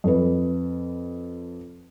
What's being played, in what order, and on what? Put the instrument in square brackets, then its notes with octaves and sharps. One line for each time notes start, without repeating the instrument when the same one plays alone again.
[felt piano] F2 B4